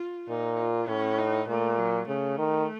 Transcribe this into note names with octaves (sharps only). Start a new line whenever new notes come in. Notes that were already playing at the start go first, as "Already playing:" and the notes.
Already playing: F4
A#2 D#4
F4
A2 C#4
D#4
A#2 A3
F#3
C#3 A3
D#3